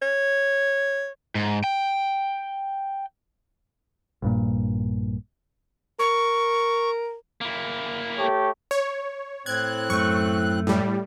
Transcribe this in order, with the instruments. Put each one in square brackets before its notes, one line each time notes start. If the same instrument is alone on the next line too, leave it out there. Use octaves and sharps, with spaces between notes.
[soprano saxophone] C#5
[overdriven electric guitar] G#2
G5
[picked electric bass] A#1 G2 A#2
[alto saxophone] A#4 [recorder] C#6
[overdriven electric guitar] A#3 E4
[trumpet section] A3 G4 C#5
[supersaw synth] C#5
[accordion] A2 C4 F#6 [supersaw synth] G#6
[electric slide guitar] F#2 A3 [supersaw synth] C#6
[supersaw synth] A2 G3